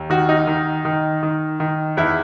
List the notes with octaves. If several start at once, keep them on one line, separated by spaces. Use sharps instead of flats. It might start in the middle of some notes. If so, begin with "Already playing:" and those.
Already playing: D#2
D#3 F#4
D#4
D#3
D#3
D#3
D#3
E2 E4